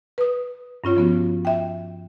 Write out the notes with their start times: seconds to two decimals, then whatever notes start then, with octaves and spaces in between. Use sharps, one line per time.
0.18 B4 D#6
0.84 G2 C#4 F4 C#5
0.96 F3 B3 C#4 F#4
1.45 E5 G5